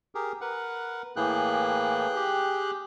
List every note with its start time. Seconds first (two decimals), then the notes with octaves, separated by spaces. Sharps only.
0.15 G4 G#4 A#4
0.41 A#4 B4 F#5
1.16 A2 E3 A#3 G#4 G5 F#6
2.16 G4